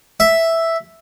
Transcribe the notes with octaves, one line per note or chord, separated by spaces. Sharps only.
E5